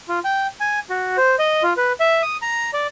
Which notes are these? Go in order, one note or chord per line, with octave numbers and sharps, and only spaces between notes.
F4
G5
G#5
F#4
C5
D#5
F4
B4
E5
D#6
A#5
D5